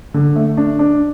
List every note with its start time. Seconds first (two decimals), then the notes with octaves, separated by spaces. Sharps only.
0.14 D3
0.36 A3
0.57 D4
0.79 D4